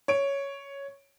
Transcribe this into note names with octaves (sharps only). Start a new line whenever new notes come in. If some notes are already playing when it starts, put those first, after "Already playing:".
C#5 D7